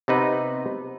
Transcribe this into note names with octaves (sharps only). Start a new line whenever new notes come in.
C3 B3 D#4 B4